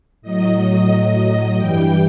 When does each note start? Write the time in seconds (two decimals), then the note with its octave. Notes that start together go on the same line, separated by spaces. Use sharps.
0.22 A2 F#3 D#5
1.56 G2 E3 G3 G5